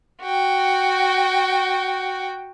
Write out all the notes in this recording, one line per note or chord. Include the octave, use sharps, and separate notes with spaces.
F#4 G5